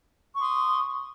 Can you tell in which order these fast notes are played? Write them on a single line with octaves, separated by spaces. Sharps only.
C#6 C6 D#6